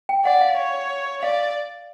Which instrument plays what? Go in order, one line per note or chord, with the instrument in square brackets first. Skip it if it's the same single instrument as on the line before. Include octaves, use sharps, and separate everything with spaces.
[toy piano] G5
[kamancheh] D5 [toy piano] F#5
[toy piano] F5
[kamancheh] C#5
[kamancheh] D5 [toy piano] F5